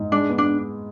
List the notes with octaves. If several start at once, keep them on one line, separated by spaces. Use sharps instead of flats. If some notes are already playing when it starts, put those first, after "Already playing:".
Already playing: G#2
G#3 D4
B3
D4